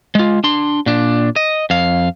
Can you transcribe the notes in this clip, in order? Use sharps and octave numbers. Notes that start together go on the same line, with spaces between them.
G#3 F4
D4 C6
A#2 D4
D#5
F2 F5